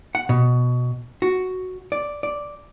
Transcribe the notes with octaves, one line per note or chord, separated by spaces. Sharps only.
F#5
B2
F#4
D5
D5